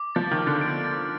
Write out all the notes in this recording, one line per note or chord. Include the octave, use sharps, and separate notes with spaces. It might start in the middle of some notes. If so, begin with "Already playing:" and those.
Already playing: D6
F3 A6
D#3
F6
D3
D7
A6